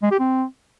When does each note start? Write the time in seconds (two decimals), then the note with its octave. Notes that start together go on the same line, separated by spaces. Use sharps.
0.02 G#3
0.11 G4
0.20 C4